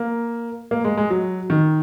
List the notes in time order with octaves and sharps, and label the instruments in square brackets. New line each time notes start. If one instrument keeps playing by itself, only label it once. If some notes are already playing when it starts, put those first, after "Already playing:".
Already playing: [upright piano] A#3
A#3
G#3
G#3
F#3
D#3